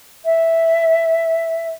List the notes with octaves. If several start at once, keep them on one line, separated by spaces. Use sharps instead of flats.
E5